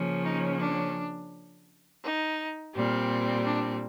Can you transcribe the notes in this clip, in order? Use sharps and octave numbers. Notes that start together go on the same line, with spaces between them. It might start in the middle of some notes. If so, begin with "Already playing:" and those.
Already playing: C#3 F3 A#3 C#4
D#4
D4
D#4
A#2 G3 C4
D4